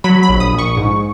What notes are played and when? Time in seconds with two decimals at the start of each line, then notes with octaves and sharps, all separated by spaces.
0.04 F#3 B5
0.23 B5
0.29 A#1
0.40 D#6
0.53 A#1
0.58 C#6
0.77 G#2